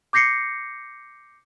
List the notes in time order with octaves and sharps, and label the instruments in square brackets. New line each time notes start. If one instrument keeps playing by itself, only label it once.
[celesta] D6 G6 A#6 C7 C#7